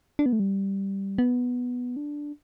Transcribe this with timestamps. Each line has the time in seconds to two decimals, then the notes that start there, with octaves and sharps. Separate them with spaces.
0.19 D4
0.26 B3
0.33 A3
0.40 G3
1.18 B3
1.96 D4